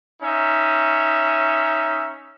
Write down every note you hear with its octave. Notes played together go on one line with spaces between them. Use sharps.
C#4 D#4 E5